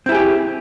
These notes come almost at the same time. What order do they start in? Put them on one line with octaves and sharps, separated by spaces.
C4 E4 G#4 G4